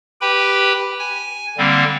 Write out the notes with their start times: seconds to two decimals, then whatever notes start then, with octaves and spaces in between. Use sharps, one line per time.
0.21 G4 B4 G5 B5
0.99 G#5
1.58 D3 G3 A#3 C4